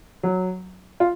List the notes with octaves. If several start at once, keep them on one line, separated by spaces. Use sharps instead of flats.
F#3
F4